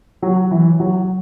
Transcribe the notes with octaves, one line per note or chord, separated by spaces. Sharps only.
F#3
E3
F#3